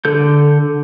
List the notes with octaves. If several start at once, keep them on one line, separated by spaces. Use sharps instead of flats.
D3 A4 G6